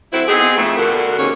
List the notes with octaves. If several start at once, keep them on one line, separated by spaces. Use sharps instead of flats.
F#3 A3 C4 E4
B3 C4 D#4 G#4
F2 A3
B2 D3 F#4 A#4
D#2 G#2 D3 C#4 C#5